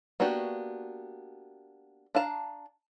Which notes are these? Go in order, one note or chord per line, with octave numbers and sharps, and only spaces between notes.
A#3 B3 D4 F#4 G4
D4 F5 A5 A#5